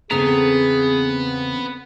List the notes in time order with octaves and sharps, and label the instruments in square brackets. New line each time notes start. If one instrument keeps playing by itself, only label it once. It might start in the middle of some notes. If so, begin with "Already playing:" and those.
[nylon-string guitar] E2 C#3 [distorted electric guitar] B3 [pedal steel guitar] C4 A4 A#5 [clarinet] G#4